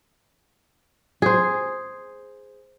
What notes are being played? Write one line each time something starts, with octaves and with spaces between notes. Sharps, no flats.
G#4 C5